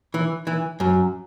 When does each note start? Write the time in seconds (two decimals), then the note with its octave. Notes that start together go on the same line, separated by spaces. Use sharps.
0.14 E3
0.47 E3
0.80 F#2